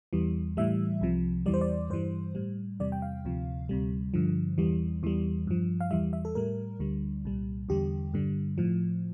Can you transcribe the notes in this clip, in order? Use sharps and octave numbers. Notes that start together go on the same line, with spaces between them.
E2 E3 G3
A2 E3 G3 E5
C2 C3 F3
E2 E3 G3 D5
C5
D5
G2 E3 G3 C5
A2 G3
E2 C3 G3 D5
G5
F5
D2 C3 F3
D2 C3 G3
G2 D3 F3
E2 E3 G3
E2 E3 G3
G2 F3
F5
E2 E3 G3 E5
E5
A4
A2 G3 A#4
D2 D3 G3
C2 A#2 G3
E2 D3 G3 G4
G2 D3 G3
A2 F3